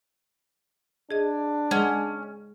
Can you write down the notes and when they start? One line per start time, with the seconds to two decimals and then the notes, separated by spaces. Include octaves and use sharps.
1.11 D4 G#4 D#5
1.71 G#3 C#4 F#5 G#6